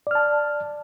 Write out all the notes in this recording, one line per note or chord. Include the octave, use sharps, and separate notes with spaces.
D5 A5 F6